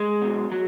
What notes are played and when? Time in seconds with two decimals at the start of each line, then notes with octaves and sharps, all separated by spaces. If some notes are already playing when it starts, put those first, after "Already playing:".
Already playing: G#3
0.22 B2 F#3
0.52 F#3